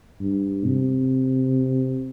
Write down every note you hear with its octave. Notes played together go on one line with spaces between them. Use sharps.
G2
C3